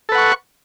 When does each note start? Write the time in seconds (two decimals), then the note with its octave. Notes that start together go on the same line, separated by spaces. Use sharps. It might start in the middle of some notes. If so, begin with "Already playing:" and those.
0.09 A4
0.12 B4
0.15 F#5
0.18 C#6